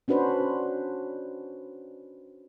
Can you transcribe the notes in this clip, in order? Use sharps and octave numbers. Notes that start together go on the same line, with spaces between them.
C#4 D4 F#4 B4 C5